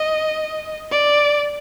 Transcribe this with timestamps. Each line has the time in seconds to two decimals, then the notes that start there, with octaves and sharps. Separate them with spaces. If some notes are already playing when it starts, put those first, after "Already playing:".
Already playing: D#5
0.91 D5